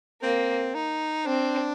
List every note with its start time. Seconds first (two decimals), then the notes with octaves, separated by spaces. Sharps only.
0.23 A#3 C4
0.74 D#4
1.26 C4 D4